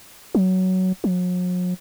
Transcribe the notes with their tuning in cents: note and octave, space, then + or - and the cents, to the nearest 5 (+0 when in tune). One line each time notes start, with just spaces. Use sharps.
F#3 +10
F#3 -45